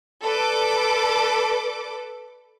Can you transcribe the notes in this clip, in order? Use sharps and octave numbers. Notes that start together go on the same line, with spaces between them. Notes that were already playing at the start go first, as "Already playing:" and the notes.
A4 B4 D5 D6